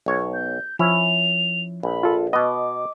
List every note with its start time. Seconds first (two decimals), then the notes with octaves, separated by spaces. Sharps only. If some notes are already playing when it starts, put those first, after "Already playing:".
0.06 B1 C#5
0.34 G6
0.79 F3 C#4 E4 F7
1.83 A#1 B5
2.03 F4 A4
2.33 B2 B3 D#5 D6